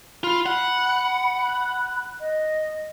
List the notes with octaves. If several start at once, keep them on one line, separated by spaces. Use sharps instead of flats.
F4 B5
F#5 B5
D#5